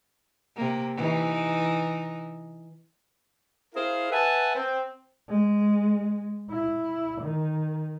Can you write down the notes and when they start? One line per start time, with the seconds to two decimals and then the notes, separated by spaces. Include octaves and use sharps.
0.56 C3 A#3
0.97 E3 D#4
3.75 E4 G#4 A#4 C5 F5
4.12 B4 E5 F#5 G#5 A5
4.55 C4
5.29 G#3
6.51 E4
7.21 D#3